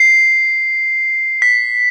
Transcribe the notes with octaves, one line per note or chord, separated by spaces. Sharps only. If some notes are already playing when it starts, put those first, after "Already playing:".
Already playing: C7
B6